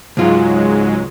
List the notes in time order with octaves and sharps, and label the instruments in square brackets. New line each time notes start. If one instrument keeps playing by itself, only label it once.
[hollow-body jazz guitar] C#2 F4 [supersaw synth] G#2 F#3 G#3